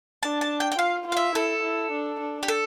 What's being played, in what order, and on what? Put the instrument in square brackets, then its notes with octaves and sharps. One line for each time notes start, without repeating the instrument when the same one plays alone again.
[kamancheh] D4 [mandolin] A5
[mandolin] A5
G5
G5
[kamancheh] F4 [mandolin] F5
[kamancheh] F4 [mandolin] F5
[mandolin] E5
[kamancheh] E4 [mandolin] A4
[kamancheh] E4
D4
D4
[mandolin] G4
A4